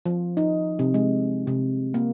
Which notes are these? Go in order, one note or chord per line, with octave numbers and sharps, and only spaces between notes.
F3
D#4
C3
G#3
C3
A#3